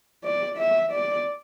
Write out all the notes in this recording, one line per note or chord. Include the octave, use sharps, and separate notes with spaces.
D5
E5
D5